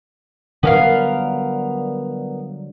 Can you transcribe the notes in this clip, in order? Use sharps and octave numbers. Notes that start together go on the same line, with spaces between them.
D3 F#3 G3 B3 A#4 F5